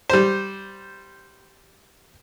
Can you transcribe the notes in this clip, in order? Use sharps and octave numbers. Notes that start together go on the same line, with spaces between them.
G3 C5